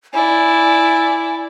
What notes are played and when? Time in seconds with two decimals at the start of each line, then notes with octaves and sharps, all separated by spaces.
0.14 E4 D5 G#5